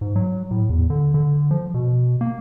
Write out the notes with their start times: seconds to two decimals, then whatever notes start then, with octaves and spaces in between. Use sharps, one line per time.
0.01 G#2
0.16 F#3
0.51 A2
0.70 E2
0.90 D3
1.14 D3
1.51 F3
1.74 B2
2.21 A#3